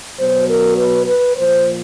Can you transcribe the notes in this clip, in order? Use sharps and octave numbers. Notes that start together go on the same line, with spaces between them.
B2 F#3 C5
A#4
B4
B4
A#2 F3 C5